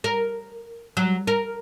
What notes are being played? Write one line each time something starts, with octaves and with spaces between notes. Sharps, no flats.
A#4
F#3
A#4